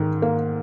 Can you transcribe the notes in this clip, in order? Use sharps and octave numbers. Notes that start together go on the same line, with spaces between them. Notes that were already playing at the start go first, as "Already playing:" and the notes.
Already playing: G#2 D#3
A#3